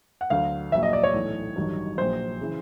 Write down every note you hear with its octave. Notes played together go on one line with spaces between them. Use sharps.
F#5
D2 D3 F#3 F5
A#1 A#2 F#3 E5
D#5
D5
C#5
B1 A2 E3
A1 G2 D#3 F#3
A#1 A#2 F#3 C5
C#3 E3